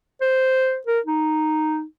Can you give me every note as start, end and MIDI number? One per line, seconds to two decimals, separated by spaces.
0.21 0.78 72
0.87 0.99 70
1.06 1.83 63